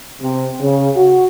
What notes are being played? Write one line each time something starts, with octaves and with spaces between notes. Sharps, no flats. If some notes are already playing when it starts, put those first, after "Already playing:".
C3
C#3
F#4